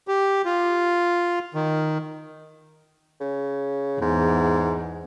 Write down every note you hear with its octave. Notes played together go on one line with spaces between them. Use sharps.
G4
F4
D#3
C#3
E2 G#2